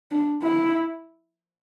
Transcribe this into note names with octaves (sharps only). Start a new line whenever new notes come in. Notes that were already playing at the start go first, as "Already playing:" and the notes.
D4
E4